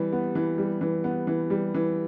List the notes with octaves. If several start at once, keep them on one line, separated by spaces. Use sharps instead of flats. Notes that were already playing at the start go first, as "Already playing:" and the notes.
Already playing: E3 G3
B3
E3
G3
E3
B3
E3
G3
E3